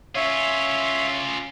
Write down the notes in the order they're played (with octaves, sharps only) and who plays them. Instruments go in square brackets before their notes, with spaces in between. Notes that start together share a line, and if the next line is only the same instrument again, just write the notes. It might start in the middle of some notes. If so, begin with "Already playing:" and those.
[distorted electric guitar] C#4 F4 [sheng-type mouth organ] C#5 E5